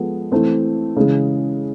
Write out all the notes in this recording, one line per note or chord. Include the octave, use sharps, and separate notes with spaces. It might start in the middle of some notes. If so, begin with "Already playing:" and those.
Already playing: F3 G#3 B3 A4
E3 A3 C4
C#3 E3 G#3